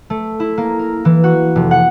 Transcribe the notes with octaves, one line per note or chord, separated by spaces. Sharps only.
A3
E4
A#3
A#4
E3
F#4
F1
F#5